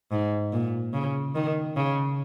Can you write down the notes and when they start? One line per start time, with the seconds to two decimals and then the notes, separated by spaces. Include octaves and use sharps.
0.12 G#2
0.52 A#2
0.94 C#3
1.35 D#3
1.77 C#3